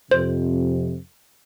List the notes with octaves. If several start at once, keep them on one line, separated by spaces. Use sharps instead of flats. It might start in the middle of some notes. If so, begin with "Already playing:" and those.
F2 C3 C5